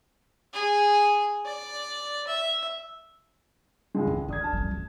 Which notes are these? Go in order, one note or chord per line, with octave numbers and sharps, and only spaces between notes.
G#4
D5
E5
C#2 G#3
D3 E4
D3 D4 D#6 G#6
A5 F6
F#2 G3
D2